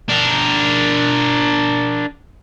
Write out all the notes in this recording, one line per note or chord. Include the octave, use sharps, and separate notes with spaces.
D4 A#4